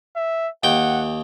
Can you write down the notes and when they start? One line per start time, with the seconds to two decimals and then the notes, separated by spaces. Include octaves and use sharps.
0.16 E5
0.64 D#2 F#5 G5